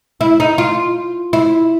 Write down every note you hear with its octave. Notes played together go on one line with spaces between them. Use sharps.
E4
D#4
F4
E4